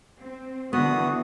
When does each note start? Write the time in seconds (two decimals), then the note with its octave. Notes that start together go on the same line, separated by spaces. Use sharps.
0.21 C4
0.73 D3 E3 B3 F#4 D#6